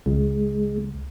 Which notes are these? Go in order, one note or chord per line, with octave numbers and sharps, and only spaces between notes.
C#2 G#3